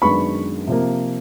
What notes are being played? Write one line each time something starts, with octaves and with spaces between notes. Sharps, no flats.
F#2 D#3 G#3 B3 D4 B5 C#6
C3 F3 A#3